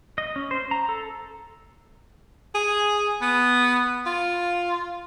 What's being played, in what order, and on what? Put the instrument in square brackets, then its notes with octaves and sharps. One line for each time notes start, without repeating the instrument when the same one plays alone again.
[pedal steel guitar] D#5
C#4
C5
A#5
A4
[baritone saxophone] G#4
B3
F4